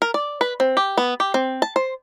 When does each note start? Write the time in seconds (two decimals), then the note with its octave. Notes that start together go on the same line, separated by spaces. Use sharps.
0.02 A#4
0.14 D5
0.41 B4
0.60 C4
0.77 G4
0.98 B3
1.20 G4
1.34 C4
1.62 A5
1.76 C5